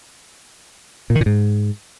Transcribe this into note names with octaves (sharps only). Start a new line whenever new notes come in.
A#2
D#3
A#2
G#2